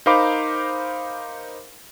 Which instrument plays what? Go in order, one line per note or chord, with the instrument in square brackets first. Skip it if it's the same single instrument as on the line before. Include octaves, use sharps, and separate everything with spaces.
[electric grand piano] D#4 A#4 C5 F5 B5 D6